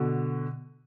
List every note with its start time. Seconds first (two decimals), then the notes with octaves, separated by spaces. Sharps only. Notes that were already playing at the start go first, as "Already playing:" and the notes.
Already playing: B2 D3